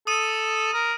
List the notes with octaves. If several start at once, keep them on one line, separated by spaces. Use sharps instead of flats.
A4 D#6 D#7
A#4